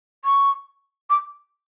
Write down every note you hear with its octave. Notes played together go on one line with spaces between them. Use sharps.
C#6
D6